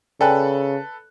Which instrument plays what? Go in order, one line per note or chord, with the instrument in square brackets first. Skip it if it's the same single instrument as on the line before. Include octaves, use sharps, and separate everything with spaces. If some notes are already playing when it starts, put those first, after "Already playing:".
[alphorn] C#3 [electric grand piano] A4 B4 F#6 [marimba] D5 G5 G#5